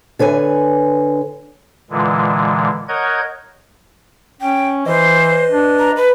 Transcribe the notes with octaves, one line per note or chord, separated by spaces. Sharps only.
D3 B4 C#5 G#5
A#2 D3 E3 G#3
A#4 C#5 D#5 F#5 G6 G#6
C#4 G5
E3 B4 C5 D#5
D4
A#5
B4